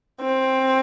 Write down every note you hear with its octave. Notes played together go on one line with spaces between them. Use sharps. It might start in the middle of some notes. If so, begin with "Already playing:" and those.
C4